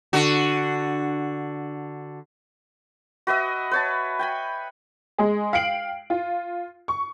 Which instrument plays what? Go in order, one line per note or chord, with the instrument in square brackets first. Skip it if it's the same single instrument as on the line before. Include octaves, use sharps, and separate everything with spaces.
[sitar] D3 F#4
[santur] F#4 B4 D#5 E5
B4 C#5 A5
G5 G#5 B5
[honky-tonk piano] G#3 G#4
F5 G5 C7 D7 F#7
F4
C#6